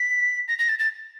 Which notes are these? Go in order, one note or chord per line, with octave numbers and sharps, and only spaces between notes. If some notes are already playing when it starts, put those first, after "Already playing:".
Already playing: B6
A#6
A#6
A6
A6